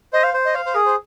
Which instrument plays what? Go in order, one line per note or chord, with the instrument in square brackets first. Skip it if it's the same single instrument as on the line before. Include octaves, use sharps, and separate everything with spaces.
[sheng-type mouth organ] C5 [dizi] D#5
[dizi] F5
[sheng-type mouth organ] C5
[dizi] D#5
[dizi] C5 [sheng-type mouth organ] F5
[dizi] C5
[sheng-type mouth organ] G#4 [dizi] A#4
[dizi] C5